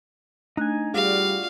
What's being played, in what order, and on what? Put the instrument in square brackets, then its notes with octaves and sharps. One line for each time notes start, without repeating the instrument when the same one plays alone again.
[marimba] A3 D4 F#6 [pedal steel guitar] D#4 G#5
[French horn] G3 [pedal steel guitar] F4 F#4 D5 [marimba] G#4 [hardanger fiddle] F5